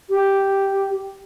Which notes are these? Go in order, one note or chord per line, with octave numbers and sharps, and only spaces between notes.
G4